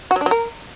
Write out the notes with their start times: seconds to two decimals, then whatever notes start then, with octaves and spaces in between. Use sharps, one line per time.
0.11 F#4
0.16 F#3
0.21 D4
0.26 F#3
0.31 A#4